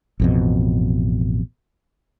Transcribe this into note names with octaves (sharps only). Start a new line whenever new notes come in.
A1 F2 B2